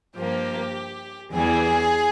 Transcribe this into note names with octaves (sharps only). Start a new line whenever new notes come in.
G2 F3 A#3 G4
E2 E3 G3 G#4